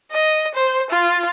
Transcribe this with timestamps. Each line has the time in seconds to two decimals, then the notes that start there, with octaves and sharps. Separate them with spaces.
0.12 D#5
0.55 C5
0.90 F4